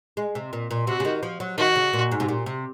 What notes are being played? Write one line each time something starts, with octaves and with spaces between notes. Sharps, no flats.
G#3
C3
A#2
A#2
C3 F#4
C#3
D#3
F3
F#3
D#3 F#4
C#3
A#2
G#2
C3
A#2
C3